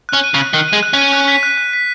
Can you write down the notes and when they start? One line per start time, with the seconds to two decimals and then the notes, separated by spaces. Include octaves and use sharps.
0.09 C#4 F#6
0.24 D#7
0.34 C#3
0.39 F#6
0.54 D#3 F#6
0.68 G#3 D#7
0.83 F#6
0.93 C#4 D#7
1.13 F#6
1.28 B6
1.43 F#6
1.58 F#6
1.73 B6